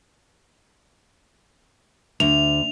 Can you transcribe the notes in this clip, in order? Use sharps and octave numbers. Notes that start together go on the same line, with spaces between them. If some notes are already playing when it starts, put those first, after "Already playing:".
D2 F7